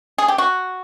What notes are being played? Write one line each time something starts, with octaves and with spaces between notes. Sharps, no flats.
G#4
G4
F#4